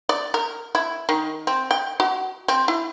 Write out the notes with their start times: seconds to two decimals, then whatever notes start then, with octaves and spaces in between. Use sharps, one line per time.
0.09 D5
0.34 A#4
0.75 E4
1.09 D#3
1.47 C4
1.71 G5
2.00 F#4
2.48 C4
2.68 E4